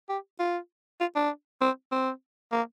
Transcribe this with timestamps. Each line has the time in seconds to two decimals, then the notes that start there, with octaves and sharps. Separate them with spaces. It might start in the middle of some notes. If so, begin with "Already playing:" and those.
0.09 G4
0.39 F4
1.00 F4
1.16 D4
1.61 C4
1.91 C4
2.52 A#3